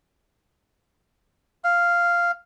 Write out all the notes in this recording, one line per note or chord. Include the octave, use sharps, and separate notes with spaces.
F5